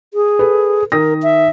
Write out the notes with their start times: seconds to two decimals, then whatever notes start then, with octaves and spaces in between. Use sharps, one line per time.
0.14 G#4
0.39 A4 B4
0.92 D#3 A#4 D#6 A#6
1.23 E5